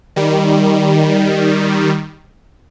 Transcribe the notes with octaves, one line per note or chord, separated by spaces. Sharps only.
D#3 G3